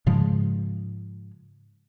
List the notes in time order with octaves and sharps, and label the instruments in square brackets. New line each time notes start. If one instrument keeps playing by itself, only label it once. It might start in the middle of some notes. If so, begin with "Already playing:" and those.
[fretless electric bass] G#2 C#3 F3 G#3